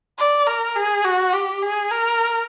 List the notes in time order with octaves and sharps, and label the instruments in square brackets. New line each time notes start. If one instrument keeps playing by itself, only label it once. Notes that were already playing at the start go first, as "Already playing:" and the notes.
[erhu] D5
A#4
G#4
F#4
G4
G#4
A#4